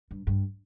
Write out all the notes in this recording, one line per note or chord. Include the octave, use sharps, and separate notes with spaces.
G2
G2